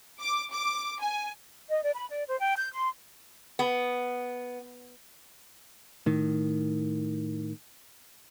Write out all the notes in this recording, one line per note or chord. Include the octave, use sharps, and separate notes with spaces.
D6
D6
G#5
D#5
D5
B5
D5
C5
G5
G6
C6
B3
A2 D#3